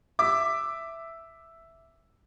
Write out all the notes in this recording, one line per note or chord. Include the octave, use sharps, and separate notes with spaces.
E5 D6